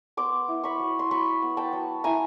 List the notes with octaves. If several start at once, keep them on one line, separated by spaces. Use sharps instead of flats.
B3 C6 D6
E4
B5 C#6
F#3
C6
F#3 B5 C#6
B3
G5 A5
F#3
E4 G#5 A#5